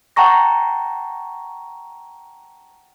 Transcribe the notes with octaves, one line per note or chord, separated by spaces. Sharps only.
F#5 G5 A5 A#5 C#6 A#6